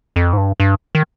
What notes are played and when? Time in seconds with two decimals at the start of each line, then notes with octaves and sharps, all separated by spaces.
0.16 F2
0.33 G#2
0.37 G2
0.60 G2
0.95 D#3